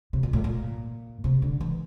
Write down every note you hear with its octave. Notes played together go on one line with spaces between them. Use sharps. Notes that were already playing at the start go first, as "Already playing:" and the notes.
C3
A#2
A2
A#2
C3
D3
E3